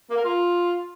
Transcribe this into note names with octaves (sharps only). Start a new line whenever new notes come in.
A#3
A#4
F4